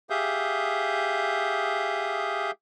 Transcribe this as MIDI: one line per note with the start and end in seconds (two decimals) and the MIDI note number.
0.10 2.51 67
0.10 2.51 68
0.10 2.51 76
0.10 2.51 77
0.10 2.51 87
0.10 2.51 91